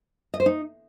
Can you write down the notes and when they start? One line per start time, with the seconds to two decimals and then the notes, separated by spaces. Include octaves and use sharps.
0.34 D#5
0.40 C5
0.46 D#4